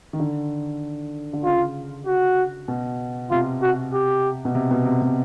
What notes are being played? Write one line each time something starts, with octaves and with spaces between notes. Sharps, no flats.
D#3
D3
D3
C#3 F4
F#4
B2
C3 F4
F#4
G4
B2
C3
B2
C3
B2